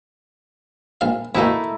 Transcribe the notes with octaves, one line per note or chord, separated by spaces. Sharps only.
A#1 F5
E2 B2 A3 A#3 D#4 E4